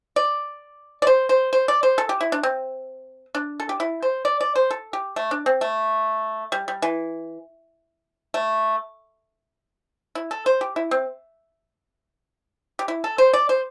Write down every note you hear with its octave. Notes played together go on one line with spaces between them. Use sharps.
D5
D5
C5
C5
C5
D5
C5
A4
G4
E4
D4
C4
D4
A4
G4
E4
C5
D5
D5
C5
A4
G4
A3
D4
C4
A3
G3
G3
E3
A3
E4
A4
C5
G4
E4
C4
G4
E4
A4
C5
D5
C5